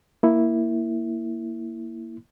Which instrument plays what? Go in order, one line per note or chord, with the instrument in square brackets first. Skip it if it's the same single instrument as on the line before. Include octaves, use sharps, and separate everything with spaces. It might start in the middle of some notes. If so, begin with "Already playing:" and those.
[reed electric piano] A#3 E4